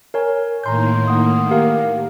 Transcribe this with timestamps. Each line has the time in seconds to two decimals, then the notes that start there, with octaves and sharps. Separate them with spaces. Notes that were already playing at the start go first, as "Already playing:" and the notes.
0.14 A#4 C#5 G#5
0.64 A2 D#3 A#3 A#5 C6 G6
1.08 F#5 D#6
1.51 G4 A#4 F5